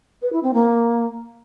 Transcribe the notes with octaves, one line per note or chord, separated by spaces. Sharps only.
B4
E4
C4
A#3